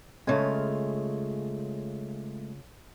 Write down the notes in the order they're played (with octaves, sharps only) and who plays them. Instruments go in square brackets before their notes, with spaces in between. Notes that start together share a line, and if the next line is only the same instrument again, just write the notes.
[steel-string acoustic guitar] C#3 F4 G#5 [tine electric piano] G#3 A3